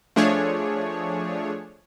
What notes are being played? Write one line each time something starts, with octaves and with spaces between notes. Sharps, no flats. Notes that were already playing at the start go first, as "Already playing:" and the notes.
F3 A3 D4 G#4 C#5